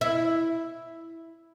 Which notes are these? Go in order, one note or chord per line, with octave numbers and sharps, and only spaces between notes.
E4